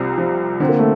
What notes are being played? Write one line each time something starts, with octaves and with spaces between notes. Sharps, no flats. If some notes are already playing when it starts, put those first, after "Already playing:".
Already playing: C2 C3 F3 C4
F3
D3 C4
A#3
A3